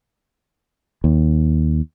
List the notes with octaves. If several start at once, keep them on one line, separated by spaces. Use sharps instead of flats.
D#2